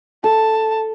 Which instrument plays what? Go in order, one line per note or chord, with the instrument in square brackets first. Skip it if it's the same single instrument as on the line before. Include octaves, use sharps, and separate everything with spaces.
[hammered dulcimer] A4 [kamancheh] A5